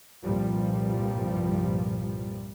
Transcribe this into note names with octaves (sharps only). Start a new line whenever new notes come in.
C2 G2 A#2 F3 G3